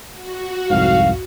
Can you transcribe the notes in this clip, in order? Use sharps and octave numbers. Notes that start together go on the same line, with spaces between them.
F#4
C2 F2 G#2 F5